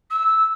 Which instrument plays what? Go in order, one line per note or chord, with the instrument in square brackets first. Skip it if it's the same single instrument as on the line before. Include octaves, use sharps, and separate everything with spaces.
[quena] E6